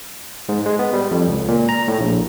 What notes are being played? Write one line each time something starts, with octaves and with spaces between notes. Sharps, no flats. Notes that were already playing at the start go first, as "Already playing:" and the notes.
G#2
G#3
B3
G3
F2
C#2
A#2
A#5
A2
A#1